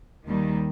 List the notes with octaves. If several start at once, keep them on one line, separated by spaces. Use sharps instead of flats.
D#2 D#3 G3